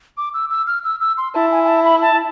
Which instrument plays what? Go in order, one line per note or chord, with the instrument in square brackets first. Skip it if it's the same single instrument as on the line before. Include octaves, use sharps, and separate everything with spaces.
[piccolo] D6
E6
E6
F6
E6
E6
C6
[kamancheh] E4 [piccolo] A5
[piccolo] G#5
G#5
A5
B5
A5